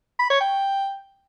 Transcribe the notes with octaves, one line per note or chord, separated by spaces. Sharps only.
B5
C#5
G5